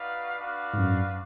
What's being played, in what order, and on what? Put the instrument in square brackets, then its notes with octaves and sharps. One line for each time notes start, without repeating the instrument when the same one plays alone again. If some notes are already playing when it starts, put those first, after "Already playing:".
Already playing: [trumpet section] D#4 F#4 B4 D5 F5
D4 F#4 B4 D5 F5
[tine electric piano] G#2
F#2